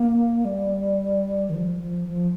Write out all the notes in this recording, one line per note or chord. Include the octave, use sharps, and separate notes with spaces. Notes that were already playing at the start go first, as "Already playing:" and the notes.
Already playing: A#3
G3
D#3
F3
F3
F3